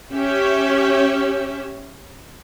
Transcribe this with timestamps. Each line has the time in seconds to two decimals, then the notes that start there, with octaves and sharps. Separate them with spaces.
0.12 C#4 G4 C#5 E5